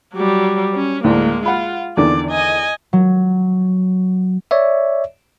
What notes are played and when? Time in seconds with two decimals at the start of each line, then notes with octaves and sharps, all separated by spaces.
0.14 F#3 G3
0.75 C#4
1.04 D2 A2 G#3 A#3
1.46 F4 F#5 B5
1.97 E2 D3 D#3 D5
2.31 D#5 G#5
2.93 F#3
4.51 C#5 D5 E5